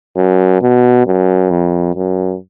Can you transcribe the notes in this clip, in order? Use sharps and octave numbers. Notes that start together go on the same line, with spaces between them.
F#2
B2
F#2
F2
F#2